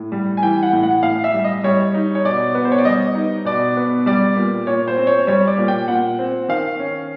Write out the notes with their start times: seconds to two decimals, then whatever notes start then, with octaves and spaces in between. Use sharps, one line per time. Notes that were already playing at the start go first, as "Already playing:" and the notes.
Already playing: A2
0.12 G3
0.37 G#5
0.42 E3 G5
0.63 F#5
0.73 A2
0.83 F#5
1.03 A2 F5
1.24 E5
1.34 G3
1.44 D#5
1.64 G3 C#5
1.94 D#4
2.15 C#5
2.25 B2 D5
2.55 B3
2.65 C5
2.72 C#5
2.78 D5
2.85 G3 D#5
3.15 D#4
3.45 B2 D5
3.77 B3
4.06 G3 D5
4.36 A#2
4.67 A#2 C#5
4.87 C5
4.97 C4
5.07 C#5
5.27 G3 C#5
5.47 D5
5.57 A#2
5.68 G5
5.88 A#2 F#5
6.19 C4
6.48 D#3 F5
6.79 C#4